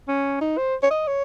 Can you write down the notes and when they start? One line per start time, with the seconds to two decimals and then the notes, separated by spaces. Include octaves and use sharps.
0.08 C#4
0.41 D#4
0.57 C5
0.83 C#5
0.91 D#5
1.07 C#5